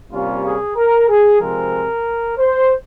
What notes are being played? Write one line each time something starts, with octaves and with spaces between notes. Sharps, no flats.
C3 G3 A#3 C#4 F4
G#4
A#4
G#4
C3 F3 G#3 C4 A#4
C5